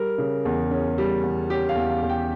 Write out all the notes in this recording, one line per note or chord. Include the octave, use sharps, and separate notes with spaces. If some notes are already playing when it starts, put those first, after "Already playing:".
Already playing: G3 A#4
C#3
E2
C#4
G3
E2
C#4 G4
F5
E2
F5
E2
G5